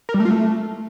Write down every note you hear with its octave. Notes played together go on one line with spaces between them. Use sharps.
A#4
G3
A3
F4
A3